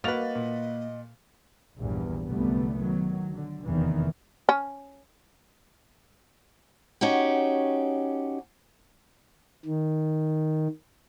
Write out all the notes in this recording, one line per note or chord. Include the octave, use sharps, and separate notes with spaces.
A#3 F#4 B4 D#5 F6 A6 F7
A#2
A#1 E2 G2
C2 F#2 D3 G3 A3 B3
D#3 F#3
D3
F1 E2 D#3 E3
C#4
C#4 D#4 F#4 G4
D#3